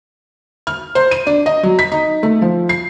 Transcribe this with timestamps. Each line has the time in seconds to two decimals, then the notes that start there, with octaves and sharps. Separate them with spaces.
0.67 F6
0.95 C5
1.11 D#7
1.27 D4
1.46 D#5
1.63 F#3
1.79 B6
1.92 D#4
2.23 A3
2.42 F3
2.69 C7